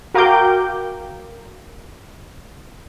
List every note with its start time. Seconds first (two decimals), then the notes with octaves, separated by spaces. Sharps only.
0.14 F#4 A#4 F5 G5 D6 G6